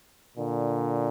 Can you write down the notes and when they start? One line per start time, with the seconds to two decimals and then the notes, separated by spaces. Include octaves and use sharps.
0.37 A#2 D3